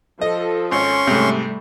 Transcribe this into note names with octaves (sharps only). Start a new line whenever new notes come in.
F3 A4 D#5
G#1 C#4 C6 C#6
G#2 C3 G3 A3